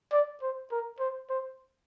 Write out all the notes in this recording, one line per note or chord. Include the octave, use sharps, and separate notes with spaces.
D5
C5
A#4
C5
C5